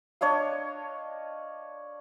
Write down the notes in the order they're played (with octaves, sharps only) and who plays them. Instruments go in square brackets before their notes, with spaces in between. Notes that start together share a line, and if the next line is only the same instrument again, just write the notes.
[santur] D4 C#5 D#5 F5